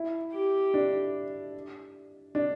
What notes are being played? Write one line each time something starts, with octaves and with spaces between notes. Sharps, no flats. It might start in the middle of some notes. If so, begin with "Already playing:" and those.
Already playing: E4
G4
D4
D4